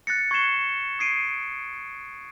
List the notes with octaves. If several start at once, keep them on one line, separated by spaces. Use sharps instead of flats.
F#6 A6 A#6 C#7
C#6 G#6 A6 C7 E7 G7
D#6 G#6 C7 D7 D#7